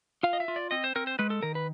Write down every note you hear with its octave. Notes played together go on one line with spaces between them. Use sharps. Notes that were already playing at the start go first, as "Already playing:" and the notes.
F4 F5
D#5
E5
F4
D5
C4 D#5
C5
C4 A#4
C5
G#3 B4
A4
D#3 A#4
B4